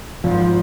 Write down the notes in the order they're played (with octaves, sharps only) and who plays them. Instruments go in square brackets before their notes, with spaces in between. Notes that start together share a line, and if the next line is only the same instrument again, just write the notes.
[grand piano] G#1 [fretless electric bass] F3